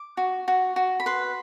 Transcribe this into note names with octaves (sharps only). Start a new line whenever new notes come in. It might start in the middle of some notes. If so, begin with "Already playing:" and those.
Already playing: D6
F#4
F#4
F#4
B5
B4 C6